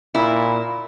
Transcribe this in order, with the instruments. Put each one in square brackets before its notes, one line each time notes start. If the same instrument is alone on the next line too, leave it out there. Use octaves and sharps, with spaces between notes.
[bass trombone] A#2 [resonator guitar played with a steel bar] E4